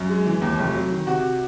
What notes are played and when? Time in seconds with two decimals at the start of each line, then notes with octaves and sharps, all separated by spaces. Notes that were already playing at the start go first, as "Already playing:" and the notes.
Already playing: F#2
0.09 G#3
0.26 E3
0.41 D#2
0.59 F1
0.74 F#3
0.92 D#3
1.07 C3 F#4